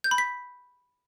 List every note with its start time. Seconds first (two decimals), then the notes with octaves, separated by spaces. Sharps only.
0.04 G6
0.11 B5
0.18 B6